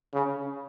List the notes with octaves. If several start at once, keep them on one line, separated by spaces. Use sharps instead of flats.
C#3